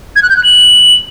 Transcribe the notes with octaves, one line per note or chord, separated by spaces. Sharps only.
G#6
F#6
G6
F#6
F#7